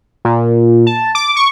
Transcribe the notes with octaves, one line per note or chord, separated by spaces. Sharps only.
A#2
A5
D6
C#6